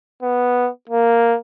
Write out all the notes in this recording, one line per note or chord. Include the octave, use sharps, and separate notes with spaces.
B3
A#3